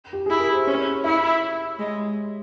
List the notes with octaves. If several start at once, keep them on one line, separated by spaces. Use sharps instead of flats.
G4
E4 G#4
A#4
C5
C#4 C#5
E4 E5
G#3